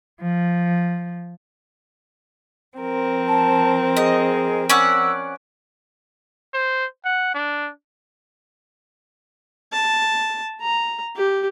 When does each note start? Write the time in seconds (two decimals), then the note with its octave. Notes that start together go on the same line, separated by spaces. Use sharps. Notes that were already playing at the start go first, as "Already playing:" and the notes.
0.21 F3
2.77 F3 C4 A#4
3.28 A5
3.97 G#4 D#5
4.69 C#4 D5 F#5 E6
6.53 C5
7.05 F#5
7.34 D4
9.72 A5
10.61 A#5
11.16 G4